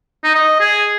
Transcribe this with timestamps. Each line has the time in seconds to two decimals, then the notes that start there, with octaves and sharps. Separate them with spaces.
0.24 D#4
0.35 D#5
0.60 G#4